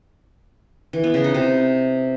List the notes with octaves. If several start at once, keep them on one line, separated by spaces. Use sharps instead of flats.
E3
B3
C#3
D#4
C3